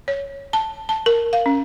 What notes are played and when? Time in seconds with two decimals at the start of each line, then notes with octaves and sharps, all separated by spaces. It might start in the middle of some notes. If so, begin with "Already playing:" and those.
0.08 C#5
0.53 A5
0.89 A5
1.06 A#4
1.33 F5
1.46 C#4